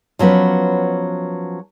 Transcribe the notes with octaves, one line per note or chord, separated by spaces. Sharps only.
F3 F#3 B3 C#4 B4